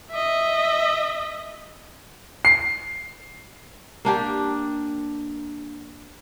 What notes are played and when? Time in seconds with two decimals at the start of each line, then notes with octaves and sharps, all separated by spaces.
0.11 D#5 E5
2.45 C7
4.05 A#3 D4 G4